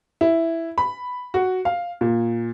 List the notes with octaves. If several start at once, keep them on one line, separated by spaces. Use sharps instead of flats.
E4
B5
F#4
F5
A#2